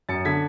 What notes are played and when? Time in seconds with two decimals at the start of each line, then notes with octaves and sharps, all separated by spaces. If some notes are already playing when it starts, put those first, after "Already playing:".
0.09 F#2 A6 C#7
0.25 D3 G#6 B6